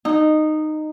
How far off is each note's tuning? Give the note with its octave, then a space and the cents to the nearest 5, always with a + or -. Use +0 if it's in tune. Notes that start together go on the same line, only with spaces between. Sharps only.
D#4 -15